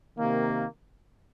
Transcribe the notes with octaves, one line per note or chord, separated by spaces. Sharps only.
C3 D#3 A#3